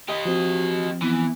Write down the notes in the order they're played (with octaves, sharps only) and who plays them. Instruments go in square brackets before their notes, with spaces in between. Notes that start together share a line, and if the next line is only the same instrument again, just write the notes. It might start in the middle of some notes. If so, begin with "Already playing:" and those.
[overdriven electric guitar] G4 D#5
[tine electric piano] F3 C4 [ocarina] F#4
[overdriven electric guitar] E3 [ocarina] B3